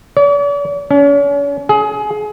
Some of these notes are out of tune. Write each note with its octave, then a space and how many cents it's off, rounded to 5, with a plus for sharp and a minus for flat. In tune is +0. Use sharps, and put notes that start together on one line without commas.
D5 -45
C#4 +40
G#4 +25